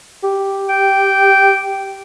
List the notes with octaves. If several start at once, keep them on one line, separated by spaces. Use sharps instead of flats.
G4
G5